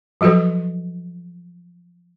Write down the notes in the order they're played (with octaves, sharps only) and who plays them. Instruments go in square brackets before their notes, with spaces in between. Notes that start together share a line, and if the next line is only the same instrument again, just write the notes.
[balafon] F3 F#3 F#4 A4 B4